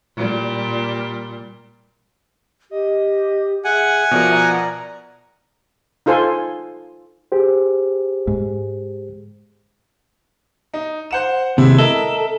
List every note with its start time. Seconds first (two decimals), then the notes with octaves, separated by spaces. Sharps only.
0.16 A#2 G3
2.71 G4 D#5
3.64 G#4 E5 F#5 G#5
4.11 B2 F3 A#4 D5
4.32 A#5
6.06 D#4 F4 A4 C5 G#5 C6
7.32 G4 G#4 C5
8.27 G#2
10.74 D#4
11.11 C5 F#5 E7
11.58 D#2 C3 G#3 E4
11.78 A4 A#4 D#5 E5